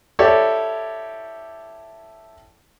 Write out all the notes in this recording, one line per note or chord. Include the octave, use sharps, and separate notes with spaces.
E4 G4 A4 C#5 D5